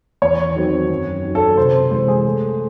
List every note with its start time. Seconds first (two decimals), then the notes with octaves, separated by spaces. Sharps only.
0.22 E2 C#5
0.56 D#3 F#3 C4
0.90 F#2
1.24 D#3 F#3
1.35 A4
1.57 C3 C5
1.91 E3 G#3 C5
2.08 G#4
2.25 A3